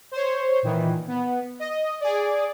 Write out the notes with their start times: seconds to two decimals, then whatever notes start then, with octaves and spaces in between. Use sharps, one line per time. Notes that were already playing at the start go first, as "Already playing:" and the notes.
0.12 C5 C#5
0.63 A#2 D#3 E3
1.08 B3
1.59 D#5
2.01 G#4 D5